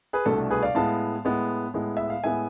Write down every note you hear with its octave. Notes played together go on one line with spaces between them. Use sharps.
G#4 B4
C2 B2 A3 D4 A4
G#4 B4
D5 F5
A2 G#3 B3 F5 A5
A2 G#3 B3
A2 G#3 B3
E5
F5
A2 G#3 B3 E5 G#5